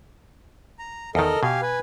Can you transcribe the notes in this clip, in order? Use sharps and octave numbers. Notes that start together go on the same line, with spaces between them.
A#5
E2 D#3 A4 A#4 D#5
B2 G4 F5 G#5
B4 G#5